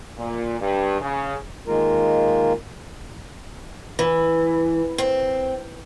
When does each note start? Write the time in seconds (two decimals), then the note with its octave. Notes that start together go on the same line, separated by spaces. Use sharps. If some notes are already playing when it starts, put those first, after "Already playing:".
0.17 A#2
0.60 G2
1.01 C#3
1.65 D#3 G#3 A#3 F4 A#4
3.99 E3
4.98 C4